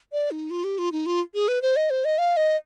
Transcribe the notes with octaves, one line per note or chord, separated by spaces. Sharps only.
D5
D#4
F4
G4
F4
D#4
F4
G#4
B4
C5
D#5
C5
D#5
F5
D#5